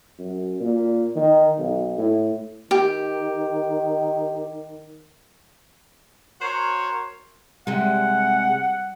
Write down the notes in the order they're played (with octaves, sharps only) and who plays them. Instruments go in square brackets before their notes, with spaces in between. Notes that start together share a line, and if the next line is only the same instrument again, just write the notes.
[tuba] F#2
A#2
D#3
B1
A2
[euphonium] D#3 [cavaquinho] G4
[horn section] F#4 A#4 C5 C#5
[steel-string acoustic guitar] C3 G#3 [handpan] G3 [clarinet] F#5